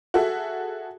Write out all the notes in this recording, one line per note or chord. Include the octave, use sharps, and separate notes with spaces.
F#4 G#4 A4 E5